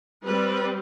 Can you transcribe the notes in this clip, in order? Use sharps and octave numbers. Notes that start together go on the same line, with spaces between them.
G3 C4 B4